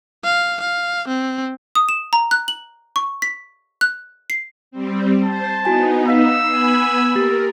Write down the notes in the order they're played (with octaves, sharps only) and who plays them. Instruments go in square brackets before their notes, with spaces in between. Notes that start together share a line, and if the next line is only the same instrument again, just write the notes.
[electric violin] F5
F5
C4
[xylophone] D#6
E7
A#5
F#6
F#7
C#6
B6
F#6
C7
[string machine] G3 C4
[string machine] C5 [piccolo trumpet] A5
[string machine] B3 D#4 [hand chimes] E4 F#4 G#5
[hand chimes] F5 B6 C7 [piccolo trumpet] E6
[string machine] B3 G#5 B5 [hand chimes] C7
[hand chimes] A#3 G4 A6 [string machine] A#4